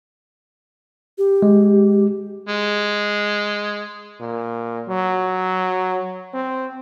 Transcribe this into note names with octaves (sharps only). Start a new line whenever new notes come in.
G4
G#3
G#3
A#2
F#3
C4